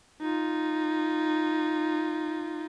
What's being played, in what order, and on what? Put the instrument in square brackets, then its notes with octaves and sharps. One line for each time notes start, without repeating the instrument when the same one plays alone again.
[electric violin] D#4 F4